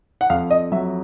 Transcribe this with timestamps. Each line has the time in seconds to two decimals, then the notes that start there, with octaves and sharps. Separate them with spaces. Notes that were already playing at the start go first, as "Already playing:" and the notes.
0.21 F#5
0.30 F2 F5
0.50 D#5
0.72 F#3 E5